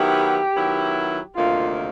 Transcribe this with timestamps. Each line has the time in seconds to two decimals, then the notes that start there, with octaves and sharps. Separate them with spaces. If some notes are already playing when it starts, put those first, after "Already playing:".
Already playing: D#3 F#3 B3 E4 G4
0.55 D#3 F#3 B3 E4
1.35 D2 C3 D#3 F#3 A#3 F4